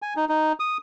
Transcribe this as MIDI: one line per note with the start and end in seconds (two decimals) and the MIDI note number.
0.02 0.14 80
0.16 0.25 63
0.29 0.53 63
0.60 0.77 87